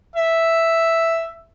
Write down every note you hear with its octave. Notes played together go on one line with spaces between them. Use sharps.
E5